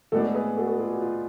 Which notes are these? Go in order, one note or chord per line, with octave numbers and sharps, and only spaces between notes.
A2 G#3 B3 D4 F#4 A4
G#4 B4
F#4 A4
F#4 A4
F4 G#4
F#4
F4